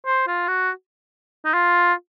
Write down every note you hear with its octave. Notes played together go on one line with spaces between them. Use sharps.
C5
F4
F#4
D#4
F4